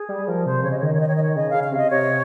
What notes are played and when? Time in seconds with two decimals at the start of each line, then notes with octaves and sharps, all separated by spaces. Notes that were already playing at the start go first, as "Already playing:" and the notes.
Already playing: G#4
0.09 G3
0.27 F3 A#4
0.46 C3 C5
0.63 C#3 C#5
0.71 D#5
0.79 C#5
0.82 D#3 D#5
0.93 C#5
1.01 D#5
1.08 D#3 C#5
1.16 D#5
1.23 C#5
1.36 C#3 D#5
1.50 C#3 F5
1.64 F5
1.72 C3
1.77 D#5
1.90 C3 C#5